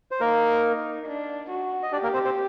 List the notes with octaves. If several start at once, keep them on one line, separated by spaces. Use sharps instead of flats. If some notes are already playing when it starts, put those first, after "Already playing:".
C5
A#3 D#4 A#4
D4
F#4
D#5
D4 G4 D5
A#3 A#4
C4 C5
C4 C5